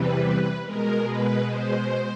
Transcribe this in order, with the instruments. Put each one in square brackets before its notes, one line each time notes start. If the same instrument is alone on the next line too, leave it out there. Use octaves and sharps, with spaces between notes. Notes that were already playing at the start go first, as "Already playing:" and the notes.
Already playing: [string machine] E2 C3 E3 G3 B4
B2 G#3 A#4
B4
C5